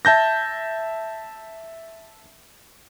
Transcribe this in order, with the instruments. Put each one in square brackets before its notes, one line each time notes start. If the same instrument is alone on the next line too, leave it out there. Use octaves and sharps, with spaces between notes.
[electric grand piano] E5 A5 G6 A#6